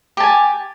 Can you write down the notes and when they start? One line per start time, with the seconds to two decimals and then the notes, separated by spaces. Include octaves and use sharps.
0.17 G4
0.20 A5
0.23 G#5